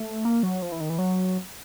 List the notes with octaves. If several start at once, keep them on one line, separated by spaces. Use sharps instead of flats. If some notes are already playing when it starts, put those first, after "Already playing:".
Already playing: A3
A#3
F#3
F3
E3
D#3
E3
F#3